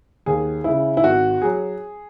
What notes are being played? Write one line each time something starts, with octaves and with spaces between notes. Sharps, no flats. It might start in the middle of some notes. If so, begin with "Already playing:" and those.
D#2 G#4
C#3 G#3 E4
E4
G#1 F#4
F#3 G#4